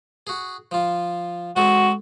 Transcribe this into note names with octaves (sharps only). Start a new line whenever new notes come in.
F#4 G#4
F3 F4
G#3 C4 F#4 A4